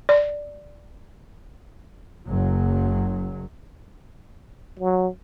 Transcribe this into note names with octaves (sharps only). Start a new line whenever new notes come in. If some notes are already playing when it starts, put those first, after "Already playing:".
D5
F#1 F#3
F#3